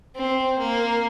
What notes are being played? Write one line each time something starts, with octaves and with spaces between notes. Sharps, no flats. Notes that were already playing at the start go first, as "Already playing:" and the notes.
C4
A#3